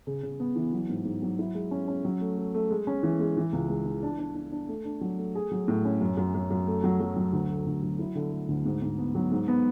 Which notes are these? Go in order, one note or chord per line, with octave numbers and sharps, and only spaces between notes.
C#3
C#3
B3
E3
F#3
G#2
G#2
F#3
E4
G#3
C#4
C#4
F#3
A3
A3
A3
G#3
C#4
E3
G#3
E3
C#2
G#3
E3
D4
D4
D4
D4
A3
D4
F#3
A3
G#4
F#3
A2
C#4
F#2
F#2
F#2
F#2
A3
F#3
F#3
F#3
D2
A3
D2
F#3
E4
D3
A3
D2
G#2
G#2
B3
F#3
G#2
B3